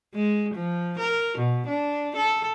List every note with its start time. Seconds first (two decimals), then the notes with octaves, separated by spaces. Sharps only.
0.15 G#3
0.54 F3
0.99 A#4
1.38 B2
1.67 D4
2.17 A4